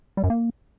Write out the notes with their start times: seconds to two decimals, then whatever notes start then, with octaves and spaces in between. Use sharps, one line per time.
0.17 G3
0.24 F#2
0.30 A#3